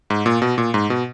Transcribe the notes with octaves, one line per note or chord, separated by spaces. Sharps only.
G#2
A#2
B2
A#2
G#2
B2